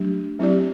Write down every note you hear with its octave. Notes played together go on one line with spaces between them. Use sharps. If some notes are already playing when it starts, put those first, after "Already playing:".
Already playing: F#3 A3 D4 G4
F#3 C4 E4 G4 D5